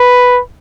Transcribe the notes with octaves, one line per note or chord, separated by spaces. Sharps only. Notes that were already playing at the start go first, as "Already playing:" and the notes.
Already playing: B4